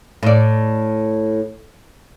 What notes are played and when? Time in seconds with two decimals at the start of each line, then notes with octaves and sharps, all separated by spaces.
0.23 A2 D5